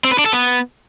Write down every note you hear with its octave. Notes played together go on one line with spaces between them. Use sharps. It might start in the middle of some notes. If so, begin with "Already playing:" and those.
C4
B4
D4
A4
B3